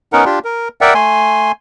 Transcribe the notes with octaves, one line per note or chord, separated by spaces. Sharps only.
B3 C#4 D#4 A#4 F#5
D4 F4 G4
A#4
A#4 D5 E5 F#5 G5
A3 G#5 C6